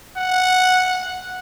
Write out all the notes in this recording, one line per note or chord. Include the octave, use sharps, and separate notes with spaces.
F#5